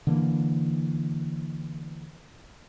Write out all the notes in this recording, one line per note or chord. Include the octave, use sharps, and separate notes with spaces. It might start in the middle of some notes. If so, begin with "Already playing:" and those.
D3 E3 A#3